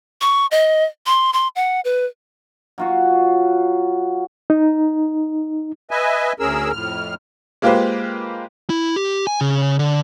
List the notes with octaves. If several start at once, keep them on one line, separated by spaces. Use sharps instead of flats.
C#6
D#5
C6
C6
F#5
B4
F#3 F4 F#4
D#4
B4 D#5 E5 G#5
D2 C#4 G#4 A#4 E6
F2 A2 F6
G#3 A#3 F4 G4 B4 C5
E4
G4
G#5
C#3
D3